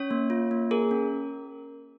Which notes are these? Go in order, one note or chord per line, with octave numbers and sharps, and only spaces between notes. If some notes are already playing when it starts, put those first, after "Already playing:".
Already playing: C#4 C#5
A#3
F4
A#3
G#4 A#4
C#4